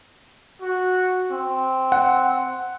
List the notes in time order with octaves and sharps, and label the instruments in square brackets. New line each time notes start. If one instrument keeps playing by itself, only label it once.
[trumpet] F#4
C4
[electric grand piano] F#5